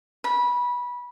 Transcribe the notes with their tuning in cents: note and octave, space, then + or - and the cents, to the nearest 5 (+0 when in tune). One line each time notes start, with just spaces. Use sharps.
B5 -20